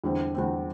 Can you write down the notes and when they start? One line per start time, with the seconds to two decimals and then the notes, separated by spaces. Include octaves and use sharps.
0.04 E2 D3 G3 C4
0.34 E2 D3 G3 C4